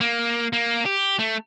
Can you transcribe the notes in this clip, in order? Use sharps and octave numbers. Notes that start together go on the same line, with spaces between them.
A#3
A#3
G4
A3